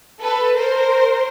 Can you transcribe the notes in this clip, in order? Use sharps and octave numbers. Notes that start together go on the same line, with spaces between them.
A4 B4
A#4 C5